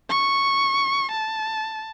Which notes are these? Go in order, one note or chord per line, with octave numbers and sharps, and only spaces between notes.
C#6
A5